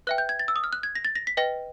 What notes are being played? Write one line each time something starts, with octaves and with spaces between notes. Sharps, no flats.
B4 E5 G5 F#6
G6
G#6
A6
E6
D#6
F6
F#6
G#6
A#6
A6
A#6
B6
B4 D#5 G5 A#6